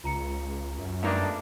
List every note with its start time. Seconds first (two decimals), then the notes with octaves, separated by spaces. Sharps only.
0.04 C#2 F4 A#5 C#7
0.78 F#2
1.03 G2 A3 A#3 D4 D#4